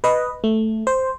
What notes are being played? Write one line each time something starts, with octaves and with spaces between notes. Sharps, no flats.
B4 D#5
A3
C5